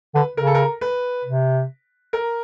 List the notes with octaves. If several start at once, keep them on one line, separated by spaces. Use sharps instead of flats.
D3 B4
C#3 A#4
A4
A#4
B4
C3
A#4